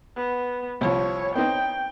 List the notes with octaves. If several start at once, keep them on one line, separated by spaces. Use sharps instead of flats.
B3
C2 F3 C#5
B3 C4 D#4 G5